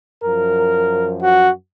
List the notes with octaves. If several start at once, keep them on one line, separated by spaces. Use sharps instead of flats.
F#2 F3 A#4
F#4